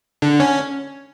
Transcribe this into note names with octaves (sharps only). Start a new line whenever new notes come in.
D3
C#4